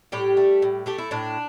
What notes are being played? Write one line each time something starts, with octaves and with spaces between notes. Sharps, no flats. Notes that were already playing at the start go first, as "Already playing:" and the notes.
A2 G3 G4
A3
A2
A3 G4
E4
A2 D4